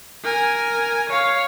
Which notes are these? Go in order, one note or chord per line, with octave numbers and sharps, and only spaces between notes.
A#4 G#5
C#5 F5